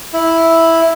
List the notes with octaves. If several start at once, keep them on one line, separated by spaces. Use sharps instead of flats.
E4